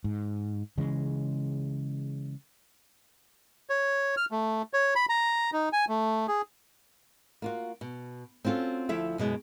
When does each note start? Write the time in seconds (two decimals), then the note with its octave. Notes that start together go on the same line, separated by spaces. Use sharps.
0.04 G#2
0.78 C#3 E3 G#3
3.70 C#5
4.17 F6
4.31 A3
4.73 C#5
4.95 B5
5.09 A#5
5.53 D#4
5.73 G#5
5.88 A3
6.28 G#4
7.42 A#3 F4 F#4
7.81 B2
8.45 C4 C#4 F4 F#4 A4
8.89 D2 F3 E4 A4 E5
9.18 F#2 B2 G#3